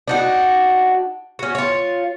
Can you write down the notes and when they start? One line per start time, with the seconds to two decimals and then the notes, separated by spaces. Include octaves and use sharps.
0.08 D4 D#4 F#4
1.39 C#4 F#4
1.55 F4 C#5